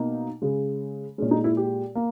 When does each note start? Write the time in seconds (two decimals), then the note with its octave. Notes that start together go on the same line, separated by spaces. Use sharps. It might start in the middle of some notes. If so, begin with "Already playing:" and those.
Already playing: B2 A#3 D#4
0.42 C#3 G#3
1.18 G#3 C#4
1.22 A#2
1.31 D#4
1.44 E4
1.57 G4
1.95 A#3